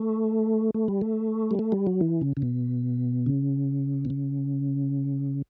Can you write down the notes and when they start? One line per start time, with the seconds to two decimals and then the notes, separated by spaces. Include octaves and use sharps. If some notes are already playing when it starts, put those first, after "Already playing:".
Already playing: A3
0.74 A3
0.88 G3
1.01 A3
1.51 G3
1.59 A3
1.72 G3
1.87 F#3
2.01 E3
2.21 C#3
2.37 C#3
2.42 B2
3.26 C#3
4.05 B2
4.10 C#3